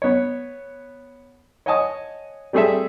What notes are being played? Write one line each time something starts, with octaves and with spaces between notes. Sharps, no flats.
B3 C#5
C#5 D#5 F#5 G#5 A5 D#6
G3 A3 C4 G#4 A4 E5